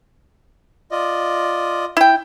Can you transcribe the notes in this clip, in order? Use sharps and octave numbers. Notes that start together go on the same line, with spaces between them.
F4 D5 D#5
E4 G5